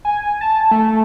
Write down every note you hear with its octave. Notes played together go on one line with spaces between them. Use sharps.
G#5
A5
A3